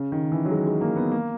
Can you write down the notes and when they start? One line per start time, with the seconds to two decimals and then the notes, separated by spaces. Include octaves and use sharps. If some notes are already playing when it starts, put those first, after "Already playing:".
Already playing: C#3
0.12 D#3
0.32 E3
0.45 F#3
0.51 G#3
0.67 G#3
0.81 A#3
0.96 B3
1.11 A#3